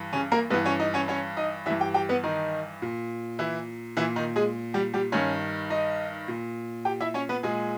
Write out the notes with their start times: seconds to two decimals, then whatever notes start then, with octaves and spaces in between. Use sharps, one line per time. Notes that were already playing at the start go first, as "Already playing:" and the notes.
Already playing: G2 E3
0.13 C#3 C#4
0.32 A#3 A#4
0.50 G2 B3 B4
0.54 E3
0.65 C#4 C#5
0.79 D#4 D#5
0.94 C#4 C#5
1.08 C#4 C#5
1.37 D#4 D#5
1.66 G2 E3 E4 E5
1.80 G4 G5
1.94 G4 G5
2.09 B3 B4
2.24 D#3 D#4
2.82 A#2
3.39 E3 E4
3.97 A#2 E3 E4
4.16 D#3 D#4
4.36 G#3 G#4
4.74 G3 G4
4.93 G3 G4
5.12 G2 D#3 C#4 C#5
5.70 D#4 D#5
6.28 A#2
6.85 G4 G5
7.00 E4 E5
7.14 C#4 C#5
7.29 B3 B4
7.43 A#2 G#3 G#4